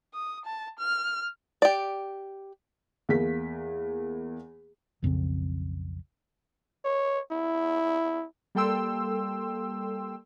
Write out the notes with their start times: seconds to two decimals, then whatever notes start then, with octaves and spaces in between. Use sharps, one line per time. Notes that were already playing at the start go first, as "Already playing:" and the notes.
0.14 D#6
0.45 A5
0.79 F6
1.62 G4 D5
3.09 E2 A#3 B6
5.02 B1 F2 C#3 C4
6.85 C#5
7.31 E4
8.55 G3 A#3 A4 G5 C6 E6